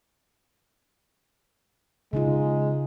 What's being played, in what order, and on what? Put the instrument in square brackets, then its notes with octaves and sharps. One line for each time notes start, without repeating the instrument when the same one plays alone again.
[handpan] C#3 D#4 F4 [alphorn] G#3